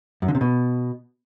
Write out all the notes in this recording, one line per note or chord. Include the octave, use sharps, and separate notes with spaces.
F#2
D3
C3
B2